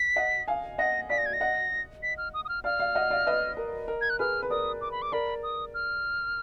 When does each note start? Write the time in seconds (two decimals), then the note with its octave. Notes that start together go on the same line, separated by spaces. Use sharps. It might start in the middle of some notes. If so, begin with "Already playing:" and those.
Already playing: B6
0.16 D#5 F#5
0.48 F5 G#5
0.78 D#5 F#5 A#6
1.09 D5 F5 B6
1.18 A#6
1.26 G#6
1.33 A#6
1.40 D#5 F#5
2.03 B6
2.18 F6
2.34 D#6
2.45 D#6
2.49 F6
2.64 D5 F5 F6
2.79 D5 F5
2.95 D#5 F#5
3.10 D5 F5
3.26 B4 D#5
3.57 A#4
3.88 A#4
4.01 G#6
4.10 F#6
4.19 G#4 B4 F6
4.42 B4
4.50 A#4 D5 D#6
4.81 D6
4.92 B5
5.02 D6
5.12 A#4 D5 B5
5.43 D#6
5.74 F6